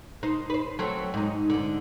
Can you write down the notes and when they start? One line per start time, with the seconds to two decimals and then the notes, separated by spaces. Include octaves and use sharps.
0.23 D#4 C5
0.50 B4 C5
0.79 F#3 A3 C4
1.14 G#2 D#4
1.50 G#2 D3